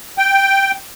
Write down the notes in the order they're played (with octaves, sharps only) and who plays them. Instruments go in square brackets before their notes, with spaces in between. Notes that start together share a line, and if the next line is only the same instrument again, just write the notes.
[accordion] G5